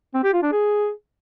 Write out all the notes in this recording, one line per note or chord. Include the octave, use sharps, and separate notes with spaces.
C4
G4
F4
D4
G#4